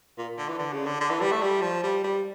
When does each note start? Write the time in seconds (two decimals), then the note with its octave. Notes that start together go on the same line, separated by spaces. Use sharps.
0.18 A#2
0.38 D3
0.48 E3
0.59 D3
0.73 C#3
0.86 D3
1.01 D3
1.10 E3
1.21 G3
1.32 A3
1.42 G3
1.62 F3
1.83 G3
2.03 G3